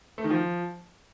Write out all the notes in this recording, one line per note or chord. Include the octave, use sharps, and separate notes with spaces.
A3
D#3
F3